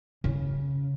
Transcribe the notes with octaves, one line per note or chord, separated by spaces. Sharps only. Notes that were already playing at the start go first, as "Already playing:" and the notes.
C#3